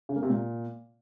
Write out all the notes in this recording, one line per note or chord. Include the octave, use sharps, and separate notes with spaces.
C#3
A#3
C3
A#2